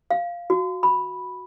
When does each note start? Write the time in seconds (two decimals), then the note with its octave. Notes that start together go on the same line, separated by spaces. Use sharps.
0.11 F5
0.50 F#4
0.83 B5